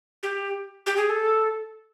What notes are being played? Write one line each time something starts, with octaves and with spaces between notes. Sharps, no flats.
G4
G4
G#4
A4